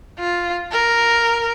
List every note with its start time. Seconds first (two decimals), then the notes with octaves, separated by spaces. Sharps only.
0.19 F4
0.72 A#4